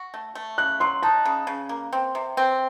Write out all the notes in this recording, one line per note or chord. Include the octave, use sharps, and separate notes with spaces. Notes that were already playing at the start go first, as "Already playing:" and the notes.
Already playing: F#4
A3
A3
C#3 F#6
F#3 C6
D#4 A5
C#3
C#3
A#3
C4
C3
C4